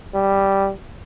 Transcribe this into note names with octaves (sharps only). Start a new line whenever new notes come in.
G3